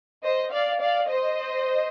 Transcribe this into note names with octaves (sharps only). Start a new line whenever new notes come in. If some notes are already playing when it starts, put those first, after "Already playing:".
C5 D#5
D5 F5
D5 F5
C5 D#5